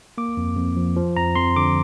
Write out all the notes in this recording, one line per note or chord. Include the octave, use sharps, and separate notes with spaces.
A#3 D6
F2
F2
F3
F3
F2 A#5
F2 C6
D3 D6